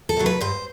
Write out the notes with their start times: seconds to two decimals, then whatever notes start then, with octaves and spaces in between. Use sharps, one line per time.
0.09 A4
0.17 C3 F#3 A3
0.26 B4
0.41 G2 C5